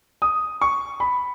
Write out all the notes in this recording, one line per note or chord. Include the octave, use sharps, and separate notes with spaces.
D#6
C#6
B5